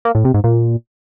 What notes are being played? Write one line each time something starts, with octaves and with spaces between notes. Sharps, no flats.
A#3
A2
C3
G#2
A#2